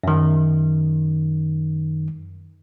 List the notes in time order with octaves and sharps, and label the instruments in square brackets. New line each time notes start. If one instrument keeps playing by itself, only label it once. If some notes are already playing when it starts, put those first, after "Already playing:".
[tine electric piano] F#2 D#3